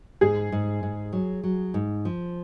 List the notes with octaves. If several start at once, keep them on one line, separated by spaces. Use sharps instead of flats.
G#2 G#4
G#2
G#2
F#3
F#3
G#2
F3